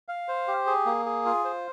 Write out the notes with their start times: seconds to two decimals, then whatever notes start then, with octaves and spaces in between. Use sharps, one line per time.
0.08 F5
0.28 C5
0.48 G4
0.67 G#4
0.86 A#3
1.06 G#4
1.25 F4
1.44 C5